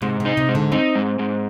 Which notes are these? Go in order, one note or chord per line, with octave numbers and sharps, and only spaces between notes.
G#2 C3
C3
D#4
C3
G#2
D3
C4 D#4
G#2
G#2